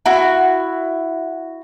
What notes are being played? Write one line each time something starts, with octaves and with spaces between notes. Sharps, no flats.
E4 F#4